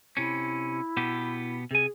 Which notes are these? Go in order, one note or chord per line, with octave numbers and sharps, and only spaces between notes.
C3 C#4 E4
B2 B3 G4
C3 G#4 G#5